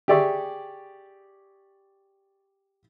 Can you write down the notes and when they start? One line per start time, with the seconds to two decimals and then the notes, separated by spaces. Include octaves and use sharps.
0.08 G4 G#4 D5 E5 C#6